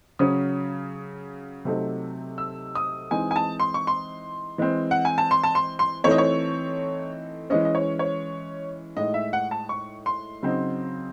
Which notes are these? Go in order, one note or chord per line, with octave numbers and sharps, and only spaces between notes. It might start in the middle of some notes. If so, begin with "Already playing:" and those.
C#3 F#3 C#4 D#6
C3 F#3 A3 C4 D#4
E6
D#6
E3 G#3 C4 D#4 G#5
G#5
A5
C6
C#6
C6
E3 G#3 C4
F#5
G#5
A5
C6
A5
C6
C6
E3 A3 C4 D#4 C#5
D#5
C#5
E3 G#3 C#4 D#5
D#5
C#5
C#5
A2 G#3 D#4 D#5
E5
F#5
A5
C#6
C6
C#3 F#3 C4 D#4